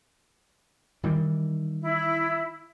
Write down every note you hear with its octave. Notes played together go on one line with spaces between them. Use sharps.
D#3 E3 G3
E4